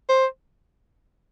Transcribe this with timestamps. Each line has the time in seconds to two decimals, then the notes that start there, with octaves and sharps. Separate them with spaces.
0.09 C5